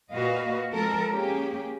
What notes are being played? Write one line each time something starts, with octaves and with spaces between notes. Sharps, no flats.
A#2 A#3 F#4 B4 D#5 F5
F3 G#3 C4 A4 A#4
A#3 C#4 G4 G#4